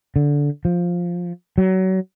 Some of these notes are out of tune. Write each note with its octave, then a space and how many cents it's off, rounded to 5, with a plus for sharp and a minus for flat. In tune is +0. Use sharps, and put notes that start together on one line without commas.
D3 -15
F3 +5
F#3 +25